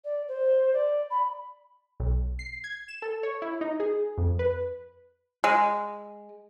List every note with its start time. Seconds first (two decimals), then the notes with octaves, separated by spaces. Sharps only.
0.05 D5
0.28 C5
0.74 D5
1.11 B5
2.00 B1
2.39 C7
2.64 G#6
2.88 E7
3.02 A4
3.23 C#5
3.42 E4
3.61 D#4
3.80 G#4
4.18 F2
4.39 B4
5.44 G#3